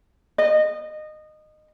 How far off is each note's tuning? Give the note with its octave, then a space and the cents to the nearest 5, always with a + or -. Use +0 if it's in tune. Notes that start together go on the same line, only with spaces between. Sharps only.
D#5 -20